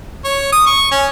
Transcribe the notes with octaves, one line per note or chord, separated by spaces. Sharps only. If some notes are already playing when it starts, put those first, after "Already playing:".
C#5
D#6
C#6
C#4